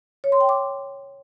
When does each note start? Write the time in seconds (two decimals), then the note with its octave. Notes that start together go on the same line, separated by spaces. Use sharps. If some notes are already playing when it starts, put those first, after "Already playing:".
0.24 C#5
0.32 C6
0.41 G5
0.49 D6